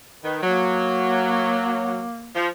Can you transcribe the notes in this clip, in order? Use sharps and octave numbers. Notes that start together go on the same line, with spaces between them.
D#3 B4
F#3 A#3
F3